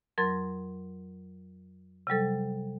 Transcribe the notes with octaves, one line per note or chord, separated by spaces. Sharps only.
F2 F#3 A#4 C6 G#6 A6
C3 F#3 G3 A4